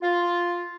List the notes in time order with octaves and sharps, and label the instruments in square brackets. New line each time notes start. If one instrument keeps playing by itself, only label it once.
[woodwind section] F4